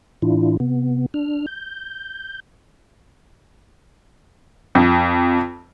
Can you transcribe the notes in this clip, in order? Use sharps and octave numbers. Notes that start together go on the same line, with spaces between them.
A2 E3 D4 E4 F4
C3 B3
D4 F6
G6
F2